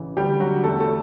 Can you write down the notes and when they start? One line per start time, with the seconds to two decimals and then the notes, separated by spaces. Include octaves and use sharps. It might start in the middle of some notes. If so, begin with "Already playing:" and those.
Already playing: A1 C#3 E3
0.17 D2 G3 G4
0.40 D2 F#3 F#4
0.64 E2 A3 A4
0.80 A3 A4